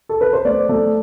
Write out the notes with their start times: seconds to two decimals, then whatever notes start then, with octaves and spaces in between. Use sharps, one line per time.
0.09 A4
0.21 B4
0.33 C5
0.45 A3 D5
0.69 A3